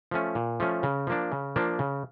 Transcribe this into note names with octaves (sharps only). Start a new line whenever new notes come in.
F3 A3 C#4
A#2
F3 A3 C#4
C#3
F3 A#3 D4
C#3
F3 A#3 D4
C#3